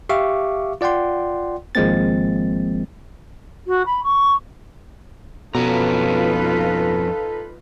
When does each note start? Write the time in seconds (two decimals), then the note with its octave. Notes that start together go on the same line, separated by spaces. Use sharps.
0.09 G4 E5 F5 C#6 D6
0.81 F4 D5 F#5 G5 C6
1.75 G#1 F3 G#3 A#3 C4 A6
3.67 F#4
3.86 B5
4.04 C#6
5.55 F2 B2 C#4 D#4 F4 A4 B4 A#5